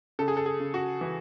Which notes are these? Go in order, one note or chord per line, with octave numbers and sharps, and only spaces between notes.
C#3 A4
G#4
A4
G#4
C#3
F#4
E3